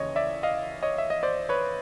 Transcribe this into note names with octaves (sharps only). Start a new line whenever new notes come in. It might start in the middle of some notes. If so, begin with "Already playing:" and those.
Already playing: D#2 C#3 E3 C#5 D#5
D5 E5
D#5 F5
C#5 D#5
E5
D#5
C5 D5
B4 C#5